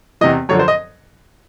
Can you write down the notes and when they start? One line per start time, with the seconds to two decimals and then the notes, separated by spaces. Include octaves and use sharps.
0.21 E2 C3 E3 D#5
0.49 F#2 D3 F3 C#5
0.59 C5
0.68 D#5